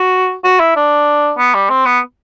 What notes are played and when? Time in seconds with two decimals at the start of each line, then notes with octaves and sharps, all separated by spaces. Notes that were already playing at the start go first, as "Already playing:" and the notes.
Already playing: F#4
0.44 F#4
0.60 E4
0.76 D4
1.38 B3
1.54 G3
1.70 C4
1.86 B3